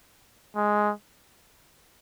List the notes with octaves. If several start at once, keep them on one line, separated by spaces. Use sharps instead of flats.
G#3